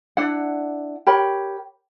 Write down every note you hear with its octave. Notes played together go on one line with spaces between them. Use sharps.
D4 E4 F#5
G4 A#4 C#5 B5